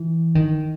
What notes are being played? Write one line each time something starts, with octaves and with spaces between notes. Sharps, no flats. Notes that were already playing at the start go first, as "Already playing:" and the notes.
Already playing: E3
D#3